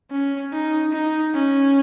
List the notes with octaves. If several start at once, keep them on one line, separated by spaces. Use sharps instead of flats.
C#4
D#4
D#4
C#4